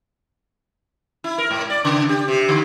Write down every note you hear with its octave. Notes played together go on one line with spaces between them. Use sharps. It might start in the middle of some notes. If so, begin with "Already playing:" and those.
E4
A#4
G#2
D5
C#3
G4
C3
D3